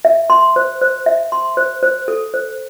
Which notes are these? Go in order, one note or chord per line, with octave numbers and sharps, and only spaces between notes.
E5
C6
C5
C5
E5
C6
C5
C5
A4
C5